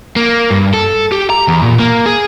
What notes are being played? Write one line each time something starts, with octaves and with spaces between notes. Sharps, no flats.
A#3
G2
A4
G4
A#5
E2
A#2
A#3
G#4